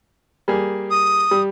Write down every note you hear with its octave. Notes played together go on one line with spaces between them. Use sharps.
G3 A#3 G#4
D#6
G3